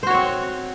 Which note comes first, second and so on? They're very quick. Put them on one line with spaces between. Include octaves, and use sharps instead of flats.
C5 F#4 C#5 C4